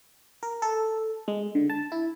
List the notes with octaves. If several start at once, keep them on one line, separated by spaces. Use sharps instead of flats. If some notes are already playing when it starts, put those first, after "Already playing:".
A#4
A4
G#3
D3
A5
E4